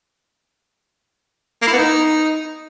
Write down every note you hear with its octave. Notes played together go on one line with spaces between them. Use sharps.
A#3
E4
B3
D#4